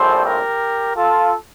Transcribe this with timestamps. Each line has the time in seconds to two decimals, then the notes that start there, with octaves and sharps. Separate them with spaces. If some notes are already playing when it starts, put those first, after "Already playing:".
Already playing: A#1 A2 G3 C4 A4 C5
0.25 G4 A#4
0.96 F4 A4